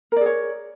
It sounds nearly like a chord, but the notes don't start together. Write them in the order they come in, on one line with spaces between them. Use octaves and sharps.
A#4 D5 G#4 C#5